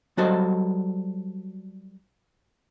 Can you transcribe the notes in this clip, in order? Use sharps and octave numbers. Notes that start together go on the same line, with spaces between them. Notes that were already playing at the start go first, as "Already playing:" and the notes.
F#3 G3 F#4 A4 C5 D#5